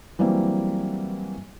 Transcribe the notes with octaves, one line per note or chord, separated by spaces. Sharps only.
E3 F#3 G3 A#3 C4